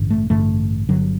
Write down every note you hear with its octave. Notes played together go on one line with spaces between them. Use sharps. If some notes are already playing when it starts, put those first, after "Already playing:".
Already playing: A1 G2 D3
A3
A1 G2 D3 A3
G1 G2 D3 F#3